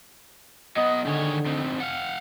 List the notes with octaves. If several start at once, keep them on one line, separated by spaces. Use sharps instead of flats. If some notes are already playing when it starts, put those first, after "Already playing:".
F#3 B3 D#5
D3 D#3 G#4 C#5
F2 C4 D#4
F5 F#5